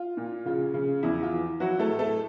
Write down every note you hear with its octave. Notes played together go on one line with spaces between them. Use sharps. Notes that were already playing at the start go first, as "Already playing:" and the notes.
Already playing: F4
A#2
C#3 F4
C#3
E2 E4
F4
E3
F#3 E4 F#4
A3 A4
A2
A3 A4